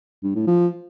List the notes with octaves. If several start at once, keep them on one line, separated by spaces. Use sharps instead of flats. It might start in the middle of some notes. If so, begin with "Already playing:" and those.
G2
A2
F3